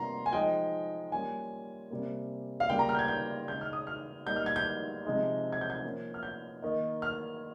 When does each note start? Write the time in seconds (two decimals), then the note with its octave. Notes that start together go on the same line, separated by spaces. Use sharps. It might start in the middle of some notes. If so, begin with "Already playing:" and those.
Already playing: C3 G3 A#3 F4 A#5 C6
0.26 G#5
0.33 F3 G#3 D#4 G5
1.12 G3 A#3 C#4 F4 G#5
1.90 C3 G3 A#3
2.60 F5
2.69 C#3 G3 A#3 F4 G5
2.79 A#5
2.89 F6
2.95 G6
2.99 G#6
3.08 G6
3.48 C#3 G#3 D#4 G6
3.61 F6
3.73 D#6
3.87 F6
4.26 G3 A#3 D#4 G6
4.36 F6
4.46 G#6
4.56 G6
5.05 C3 F3 G#3 D#4
5.53 G#6
5.61 G6
5.70 G#6
5.83 F3 A#3 C#4
6.14 F6
6.23 G6
6.62 D#3 A#3 D#4
7.02 F6